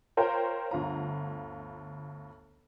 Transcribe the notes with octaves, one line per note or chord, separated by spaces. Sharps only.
F4 A#4 C5 C#5 G5
G1 D2 F4 A#5